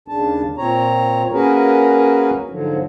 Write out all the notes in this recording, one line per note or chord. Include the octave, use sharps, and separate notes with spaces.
D#2 C#3 D4 A5
A#2 C4 C#5 A#5
A#3 C#4 F#4 G#4 A#4 B4
G#2 D3 F3 F#3